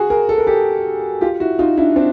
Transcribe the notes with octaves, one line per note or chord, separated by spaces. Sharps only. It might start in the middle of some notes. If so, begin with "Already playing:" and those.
Already playing: F#4 G#4
G#4 A#4
A4
A#4
G4 A4
F4 G4
E4 F#4
D#4 F4
D4 E4
C4 D4